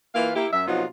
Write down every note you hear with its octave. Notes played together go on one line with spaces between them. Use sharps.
E3 A#3 E4 F4 B4 F5
A#3 E4 G4
F#2 E5
C3 F3 F#3 B3 D#4 F4